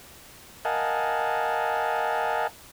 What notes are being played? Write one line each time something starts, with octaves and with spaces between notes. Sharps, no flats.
A#4 D#5 F5 F#5 G#5 A5